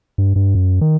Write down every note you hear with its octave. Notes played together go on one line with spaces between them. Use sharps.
G2
G2
F#2
D#3